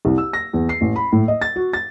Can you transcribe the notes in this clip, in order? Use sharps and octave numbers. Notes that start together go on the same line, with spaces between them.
C2
E6
A#6
E2
C7
A1
B5
A2
D#5
A6
F#4
A6